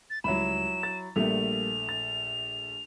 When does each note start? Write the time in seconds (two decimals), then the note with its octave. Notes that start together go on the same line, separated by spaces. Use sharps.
0.10 A6
0.24 C#2 F#3 G3 E4 B5 E7
0.83 A6
1.16 A#1 G3 A3 A#3 F7
1.89 A6